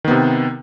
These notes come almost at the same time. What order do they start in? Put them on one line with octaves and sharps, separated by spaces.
D#3 B3 C3